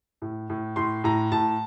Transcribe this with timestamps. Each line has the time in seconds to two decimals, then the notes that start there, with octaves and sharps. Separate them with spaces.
0.22 A2
0.50 A2
0.76 A2 C6
1.04 A2 A#5
1.32 A2 A5